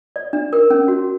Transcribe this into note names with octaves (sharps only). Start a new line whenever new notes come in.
D5
D4
A#4
C#4
F#4